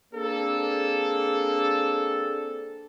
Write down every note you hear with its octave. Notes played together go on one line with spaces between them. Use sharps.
A#3 C4 D4 G#4 A4